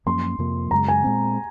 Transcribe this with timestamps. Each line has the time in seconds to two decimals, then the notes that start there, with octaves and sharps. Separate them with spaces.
0.06 F#2 F3 A#3 C#4 C6
0.39 F2 C3 F3 A#3
0.71 F#2 C#3 G#3 A#5
0.88 G#5
1.04 A#2 G#3 C4